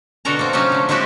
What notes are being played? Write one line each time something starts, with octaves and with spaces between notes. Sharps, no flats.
B2 D3 F#4 A4 A#4 A#5
A#3 C4
C3 F3 F#3 A#3 C#4 D#4
D3 A3
G#3 A3 C4 E4 F#4 G4